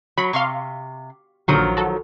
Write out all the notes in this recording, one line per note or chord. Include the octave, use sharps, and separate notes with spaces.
F#3 B5
C3 F5 C6 C#6
A#1 D3 D#3 F3 F#3 D#6
F#4 A4